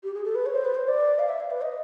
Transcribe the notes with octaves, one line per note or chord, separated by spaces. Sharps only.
G4
G#4
A4
B4
C#5
C5
B4
C5
D5
F5
E5
F5
B4
D#5